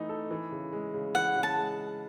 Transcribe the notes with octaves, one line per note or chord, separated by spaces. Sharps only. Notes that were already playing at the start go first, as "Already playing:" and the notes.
Already playing: E3 A3 D#4
A4
E3
C#3
G#3
C#3
E3 F#5
C#3
A5
G#3